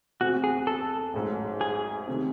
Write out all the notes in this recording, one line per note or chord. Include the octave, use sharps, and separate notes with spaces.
E2 C3 E3 A3 C4 F#4
G#4
A4
A1 G#2 F#3
G#4
C3 D#3 A3